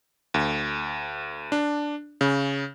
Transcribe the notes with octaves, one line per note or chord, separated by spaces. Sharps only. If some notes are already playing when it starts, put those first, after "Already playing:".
D2
D4
C#3